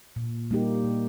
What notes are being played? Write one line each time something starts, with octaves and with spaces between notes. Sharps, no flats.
A#2
G3 A#3 D#4 G4
A#2